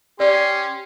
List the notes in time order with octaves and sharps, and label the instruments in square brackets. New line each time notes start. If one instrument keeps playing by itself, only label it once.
[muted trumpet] C#4 [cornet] G4 [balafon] D5 [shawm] C6